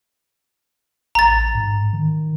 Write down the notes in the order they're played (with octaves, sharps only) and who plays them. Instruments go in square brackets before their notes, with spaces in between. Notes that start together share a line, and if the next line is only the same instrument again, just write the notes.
[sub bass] A1 [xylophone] A#5 A6
[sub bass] G#2
D#3